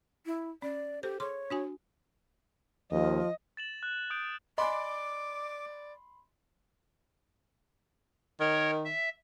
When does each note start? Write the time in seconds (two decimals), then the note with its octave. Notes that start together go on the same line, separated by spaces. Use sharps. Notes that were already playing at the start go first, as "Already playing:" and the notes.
0.26 E4
0.62 C#4 D5
1.03 G4 A4 C5
1.20 G#4 C#5 C6 D6
1.50 D4 F#4 G#5
2.91 D#2 F3 D#5
3.57 A6 E7 F#7
3.83 F#6
4.10 D#6 G6 D7
4.58 D5 D#5 G#5 B5 C6 D6
8.40 D#3 A#4 C#5
8.85 E5